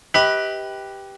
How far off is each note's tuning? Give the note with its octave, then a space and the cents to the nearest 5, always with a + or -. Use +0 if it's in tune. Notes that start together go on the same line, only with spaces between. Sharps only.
G4 +0 B4 +0 D#5 +40